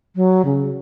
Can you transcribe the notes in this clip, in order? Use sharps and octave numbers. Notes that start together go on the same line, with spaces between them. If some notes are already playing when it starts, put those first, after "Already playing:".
F#3
C#3